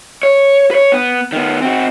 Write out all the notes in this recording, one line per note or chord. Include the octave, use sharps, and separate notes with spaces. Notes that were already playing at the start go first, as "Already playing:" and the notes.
C#5
B4 C#5
B3
D#3 B3
C4 F#4